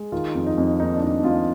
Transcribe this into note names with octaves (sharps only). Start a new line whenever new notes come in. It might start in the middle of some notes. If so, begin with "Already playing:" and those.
Already playing: G#3
D#3 F4
F2
D#4
F2
A#3 D#4
D4
D#3 D#4
F2 F4